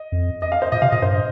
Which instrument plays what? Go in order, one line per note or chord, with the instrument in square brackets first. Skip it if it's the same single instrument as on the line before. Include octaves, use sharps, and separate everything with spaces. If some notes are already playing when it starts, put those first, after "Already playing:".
Already playing: [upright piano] D#5
[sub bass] F2
[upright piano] D#5
F5
C5
[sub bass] A#2 [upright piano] D#5
[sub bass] C3 [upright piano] F5
[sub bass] A#2 [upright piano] D#5
[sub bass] G2 [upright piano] C5